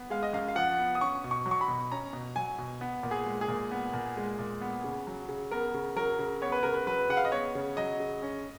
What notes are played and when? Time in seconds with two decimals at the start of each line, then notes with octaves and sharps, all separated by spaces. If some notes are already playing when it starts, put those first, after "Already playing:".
Already playing: B3
0.10 G#3 F5
0.23 D#5
0.33 F#2 F5
0.48 F5
0.55 F3 F#5
0.79 B3
0.95 D#6
1.01 C#4 C#6
1.24 B2
1.31 C#6
1.46 F#3
1.51 C#6
1.61 B5
1.68 B2
1.91 C#4 A#5
2.13 B2
2.36 F#3 G#5
2.58 B2
2.81 B3
3.03 A#2
3.11 G#4
3.26 G#3
3.41 G#4
3.48 A#2
3.71 B3
3.93 A#2
4.17 G#3
4.39 A#2
4.61 B3
4.84 C#3
5.07 F#3
5.29 C#3
5.51 B3 A#4
5.74 C#3
5.96 F#3 A#4
6.19 C#3
6.42 B3 C#5
6.52 B4
6.63 C#3 A#4
6.74 B4
6.87 F#3 B4
7.09 C#3 F#5
7.17 F5
7.25 D#5
7.31 B3 C#5
7.55 C#3
7.77 F#3 D#5
8.00 C#3
8.22 C#4